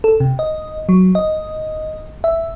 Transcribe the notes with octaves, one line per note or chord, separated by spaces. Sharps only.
A4
C3
D#5
F#3
D#5
E5